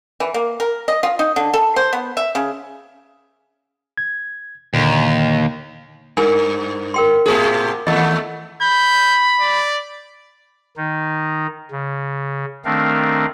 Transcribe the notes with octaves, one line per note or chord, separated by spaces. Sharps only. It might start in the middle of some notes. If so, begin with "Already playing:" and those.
E3
A#3
A#4
D#5
F4
D#4
D3
A4
C5
B3
E5
C#3
G#6
D#2 A#2 D3
G2 A#4 G#5
A#4 G5 C6
A2 C3 G#4
D#2 A3 D#5
B5 G6
D5
D#3 D#4
C#3
D#3 A3 C4 D4 A#4 F5